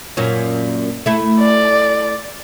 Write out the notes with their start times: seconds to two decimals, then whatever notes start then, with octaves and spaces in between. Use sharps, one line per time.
0.17 F#2 A#2 C#4
1.06 A3 E4
1.41 D5